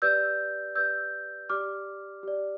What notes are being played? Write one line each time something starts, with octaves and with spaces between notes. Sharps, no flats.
G4 B4 D5 E6 G6
G4 B4 D5 E6 G6
G4 D5 D6 F6
G4 D5